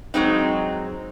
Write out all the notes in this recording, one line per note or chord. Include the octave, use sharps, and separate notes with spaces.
F#3 G#3 C4 D#4